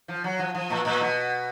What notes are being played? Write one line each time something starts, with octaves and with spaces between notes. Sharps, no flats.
F3
F#3
F3
F3
A#2
A#2
B2